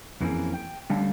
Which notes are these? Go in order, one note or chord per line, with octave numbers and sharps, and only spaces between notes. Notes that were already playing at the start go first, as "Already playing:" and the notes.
F2 E3 A#3 C4 C#4 G#4
G5
D3 G3 A3 C#4 F5 A5